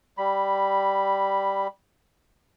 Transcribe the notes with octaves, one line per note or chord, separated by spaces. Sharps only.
G3 B5